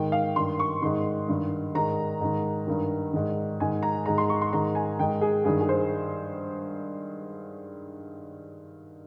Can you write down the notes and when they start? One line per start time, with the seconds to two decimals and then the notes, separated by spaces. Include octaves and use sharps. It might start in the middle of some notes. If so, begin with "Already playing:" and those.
Already playing: G#2 D#3 G5
0.12 F5
0.36 G2 D#3 C6
0.59 C#6
0.82 G#2 D#3 C6
1.28 G2 D#3
1.75 G#2 D#3 A#5
2.21 G#2 D#3
2.67 G2 D#3
3.13 G#2 D#3
3.60 G#2 D#3 G#5
3.83 A#5
4.06 G#2 D#3 A#5
4.18 C6
4.30 C#6
4.41 C6
4.53 G#2 D#3 A#5
4.75 G#5
4.99 G#2 D#3 G5
5.21 G#4
5.45 G2 D#3 G#4
5.61 G#4
5.69 C5